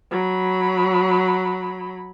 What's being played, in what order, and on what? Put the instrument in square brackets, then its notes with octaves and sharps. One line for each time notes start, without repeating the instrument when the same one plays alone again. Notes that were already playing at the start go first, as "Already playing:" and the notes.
[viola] F#3 B5